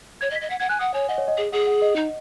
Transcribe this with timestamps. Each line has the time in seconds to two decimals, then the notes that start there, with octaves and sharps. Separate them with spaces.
0.21 C#5 G#6
0.30 D#5
0.36 B6
0.41 D#5
0.50 F#5 B6
0.60 F#5 G#6
0.69 G#5 F#6
0.79 F#5 D#6
0.94 C#5 G#5
1.09 D#5 F#5
1.18 C#5
1.28 D#5
1.37 G#4
1.52 G#4 F#5
1.67 F#5
1.82 D#5
1.96 D#4